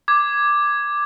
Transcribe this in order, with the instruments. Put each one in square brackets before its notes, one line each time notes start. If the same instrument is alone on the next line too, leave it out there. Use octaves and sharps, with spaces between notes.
[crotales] D6 G#6